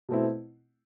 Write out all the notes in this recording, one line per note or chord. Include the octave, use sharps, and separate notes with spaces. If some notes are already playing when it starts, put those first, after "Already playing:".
B2 A3 C4 E4